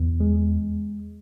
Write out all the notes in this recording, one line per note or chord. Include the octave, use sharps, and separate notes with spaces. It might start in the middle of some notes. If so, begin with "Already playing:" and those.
Already playing: E2
G#3